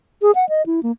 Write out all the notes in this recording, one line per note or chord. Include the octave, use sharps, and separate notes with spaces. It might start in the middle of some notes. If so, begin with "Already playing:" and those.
G#4
F#5
D#5
E4
A#3